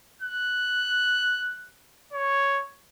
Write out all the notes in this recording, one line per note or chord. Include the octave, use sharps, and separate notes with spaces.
F#6
C#5